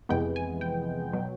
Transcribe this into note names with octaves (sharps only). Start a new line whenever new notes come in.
F2 C3 E3 G#3 B3 G5
G#5
G5
B2 F#3